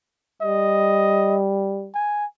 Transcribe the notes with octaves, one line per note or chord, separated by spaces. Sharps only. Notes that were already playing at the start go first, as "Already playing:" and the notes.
G3 D#5
G#5